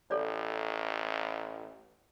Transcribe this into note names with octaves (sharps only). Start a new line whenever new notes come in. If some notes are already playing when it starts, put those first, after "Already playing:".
A1 A4 C#5 D5